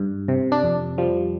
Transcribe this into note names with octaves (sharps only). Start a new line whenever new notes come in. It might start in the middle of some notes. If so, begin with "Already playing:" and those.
Already playing: G2
C3
D4
F2
F3 G3